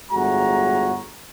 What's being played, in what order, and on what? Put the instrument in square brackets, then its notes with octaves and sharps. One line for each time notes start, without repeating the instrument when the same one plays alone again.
[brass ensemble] G1 A2 G#3 F#4 G#5 A#5